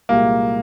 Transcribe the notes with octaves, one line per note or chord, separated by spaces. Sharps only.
C2 A#2 G#3 A#3